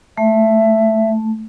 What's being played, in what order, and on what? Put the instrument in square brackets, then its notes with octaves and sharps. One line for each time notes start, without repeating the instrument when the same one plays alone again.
[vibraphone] A3 [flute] E5